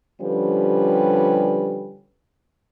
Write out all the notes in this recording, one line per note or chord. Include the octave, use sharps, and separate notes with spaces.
D3 F3 G3 C#4 G4 B4